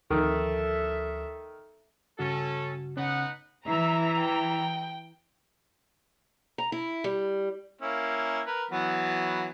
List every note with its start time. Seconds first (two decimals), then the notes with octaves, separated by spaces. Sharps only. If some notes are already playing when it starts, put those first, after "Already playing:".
0.10 D2 D#3 F3 A4 E5
2.19 G2 C#3 C#4 F#4 A4
2.97 C#3 B3 C#4 D#4 F#5
3.67 E3 E5 A#5
4.18 G5
6.58 A#5
6.72 E4
7.04 G3
7.81 A#3 C#4 E4
8.47 A#4 B4
8.71 E3 F#3 B3